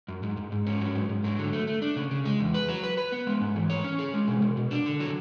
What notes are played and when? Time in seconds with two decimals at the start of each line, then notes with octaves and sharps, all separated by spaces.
0.08 F#2
0.23 G#2
0.37 G#2
0.52 G#2
0.66 C#4
0.81 F#3
0.95 G#2
1.09 G#2
1.24 F#3
1.39 D3
1.53 A3
1.67 A3
1.82 D4
1.96 C#3
2.11 C#3
2.25 G#3
2.40 E2
2.54 B4
2.69 F#3
2.83 B4
2.98 B4
3.12 B3
3.27 G#3
3.41 G#2
3.55 E3
3.70 C#5
3.84 C#4
3.99 G#4
4.13 G#3
4.28 B2
4.42 B2
4.57 B2
4.71 D4
4.86 D3
5.00 F#3